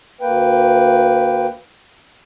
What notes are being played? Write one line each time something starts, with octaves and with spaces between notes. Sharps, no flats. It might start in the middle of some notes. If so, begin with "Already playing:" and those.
D2 A#3 B4 G5